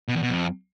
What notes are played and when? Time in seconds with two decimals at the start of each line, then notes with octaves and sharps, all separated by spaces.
0.08 B2
0.16 E2
0.23 B2
0.30 F2